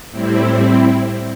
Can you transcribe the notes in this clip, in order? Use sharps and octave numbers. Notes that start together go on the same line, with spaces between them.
A2 G3 C4 E4